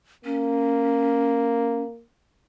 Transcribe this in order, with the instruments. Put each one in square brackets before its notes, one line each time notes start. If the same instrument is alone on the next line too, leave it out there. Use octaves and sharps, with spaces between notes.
[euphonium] A#3 [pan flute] C#4